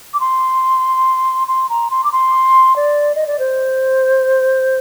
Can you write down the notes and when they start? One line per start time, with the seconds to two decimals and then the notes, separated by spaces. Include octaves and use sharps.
0.14 D6
0.20 C6
1.48 C6
1.69 A#5
1.91 C6
2.04 D6
2.12 C6
2.76 D5
3.15 D#5
3.27 D5
3.39 C5